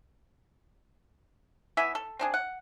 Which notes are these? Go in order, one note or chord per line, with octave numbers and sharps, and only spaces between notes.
E3 B3 E5 G#5
A4
C4 D4 G#4
F#5